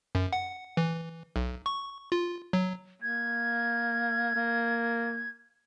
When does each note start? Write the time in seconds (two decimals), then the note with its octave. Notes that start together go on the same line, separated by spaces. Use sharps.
0.15 F#2
0.33 F#5
0.77 E3
1.36 B1
1.66 C#6
2.12 F4
2.53 F#3
3.02 A#3 G#6
4.35 A#3